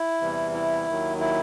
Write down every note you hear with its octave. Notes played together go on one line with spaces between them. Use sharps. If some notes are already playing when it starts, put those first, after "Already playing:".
Already playing: E4
E2 C3 E3 G3
E4
D#2 D#3 F#3
E4